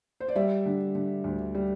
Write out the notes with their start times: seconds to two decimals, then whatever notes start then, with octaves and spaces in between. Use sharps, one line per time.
0.20 C5
0.28 D5
0.36 G3 E5
0.66 D3
0.95 D3
1.24 D2
1.55 G3